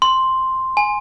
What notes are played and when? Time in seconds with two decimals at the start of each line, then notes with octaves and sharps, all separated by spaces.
0.02 C6
0.77 G#5